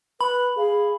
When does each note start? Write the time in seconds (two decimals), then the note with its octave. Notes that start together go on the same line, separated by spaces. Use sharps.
0.21 B4 B5
0.58 G#4 F5